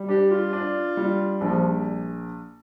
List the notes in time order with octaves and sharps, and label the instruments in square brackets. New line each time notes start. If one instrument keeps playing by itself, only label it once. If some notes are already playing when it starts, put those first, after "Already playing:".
Already playing: [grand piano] G3
[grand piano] D4 [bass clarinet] G4
[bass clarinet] F4
[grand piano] D4
G3
[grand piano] A#1 [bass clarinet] F3